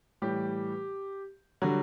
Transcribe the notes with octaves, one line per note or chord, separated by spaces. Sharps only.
A2 E3 G3 G4
D3 F#3 G3 F#4